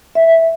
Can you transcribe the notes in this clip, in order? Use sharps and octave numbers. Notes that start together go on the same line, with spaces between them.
E5